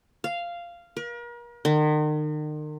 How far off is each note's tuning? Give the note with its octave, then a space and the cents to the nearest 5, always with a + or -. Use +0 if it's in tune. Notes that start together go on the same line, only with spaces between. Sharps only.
F5 -10
A#4 +40
D#3 -40